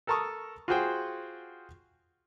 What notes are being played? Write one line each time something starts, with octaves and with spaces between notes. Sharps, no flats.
A4 A#4 A5 A#5 C#6 D#6
F4 F#4 G#4 C5 F#5 G5